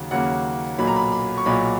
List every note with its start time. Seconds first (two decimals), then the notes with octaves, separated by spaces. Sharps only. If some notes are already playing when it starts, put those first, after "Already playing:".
Already playing: D#2 C#3 F#3 A#3
0.11 D#2 C#3 F#3 A#3 F#5
0.78 B1 A#2 F#3 A#3 B5
0.87 A#5
0.96 B5
1.12 B5
1.38 C#6
1.46 B1 A#2 F#3 A#3 B5